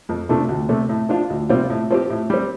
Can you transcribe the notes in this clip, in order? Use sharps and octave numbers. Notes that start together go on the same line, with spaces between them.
F2
C3 F3 A3 D4
D2
C3 A3
A2
F3 D4 F4
D2
C3 G3 C4 F4
A2
F3 C4 G4
A2
G3 C4